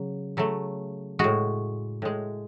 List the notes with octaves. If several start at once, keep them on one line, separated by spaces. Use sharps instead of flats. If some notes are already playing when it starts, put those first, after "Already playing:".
Already playing: C#3 F#3
C#3 F#3 A3
A2 G#3 F#4
A2 G#3